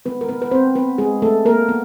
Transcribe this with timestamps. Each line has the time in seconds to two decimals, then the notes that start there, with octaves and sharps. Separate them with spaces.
0.05 D#3 G#3 B3 B4
0.21 A#4
0.29 B3 B4
0.42 B4
0.51 C4 C5
0.75 B3 B4
0.98 G#3 G#4
1.22 A3 A4
1.45 A#3 A#4
1.69 B3